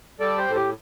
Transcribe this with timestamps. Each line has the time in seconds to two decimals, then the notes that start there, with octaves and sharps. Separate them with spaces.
0.20 G3 A4 D5
0.38 G4 C5
0.48 A2 A4
0.56 G4